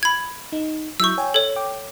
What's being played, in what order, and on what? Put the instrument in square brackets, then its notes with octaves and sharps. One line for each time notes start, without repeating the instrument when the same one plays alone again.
[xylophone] B5 G#6
[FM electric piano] D#4
[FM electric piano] F#3 E4 G6 [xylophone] C#6 E6
[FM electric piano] C#5 G5 G#5
[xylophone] A4 C#5 [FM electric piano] G#6
[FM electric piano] G5 D6